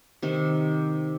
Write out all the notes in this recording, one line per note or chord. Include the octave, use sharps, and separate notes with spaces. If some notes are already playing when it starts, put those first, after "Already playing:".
C3 D#3